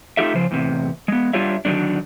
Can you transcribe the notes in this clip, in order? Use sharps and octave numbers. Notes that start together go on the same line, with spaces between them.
A3 D#4 F4 G4 A4 E5
C#3 F3 C5
E2 A2 C3
G#3 B3
G3 D4 F4 G4 C#5 E5
D3 D#3 F#3 G3 D4